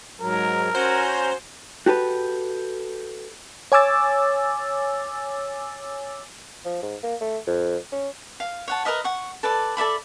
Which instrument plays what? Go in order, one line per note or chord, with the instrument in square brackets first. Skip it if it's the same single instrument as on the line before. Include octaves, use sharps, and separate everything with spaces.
[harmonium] G#2 F#3 [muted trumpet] A#4
[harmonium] C#4 A#5 [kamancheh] F#4 G#5 [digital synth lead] C5
[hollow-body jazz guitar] F#4 G4 A4 B4
[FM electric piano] C#5 G#5 D6 E6 A6
[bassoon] F3
G#2
A#3
A3
F2
C#4
[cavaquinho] F5
C#5 F#5 A5
A#4 B4 D#5 E5
F#5 C#6
A4 B4 D5 A5
A4 D5 E5 B5